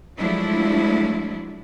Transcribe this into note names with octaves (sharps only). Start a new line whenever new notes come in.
F3 F#3 G#3 A3 D4 E4